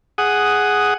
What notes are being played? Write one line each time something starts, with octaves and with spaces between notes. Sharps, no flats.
G#4 F#5 D#6